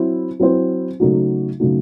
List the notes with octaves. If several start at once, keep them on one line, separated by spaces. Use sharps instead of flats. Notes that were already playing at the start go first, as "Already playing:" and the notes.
Already playing: F#3 C4 E4 C5
F#3 C4 E4 C5
C#3 F#3 A3 D#4 F#4
C#3 F#3 A3 D#4 F#4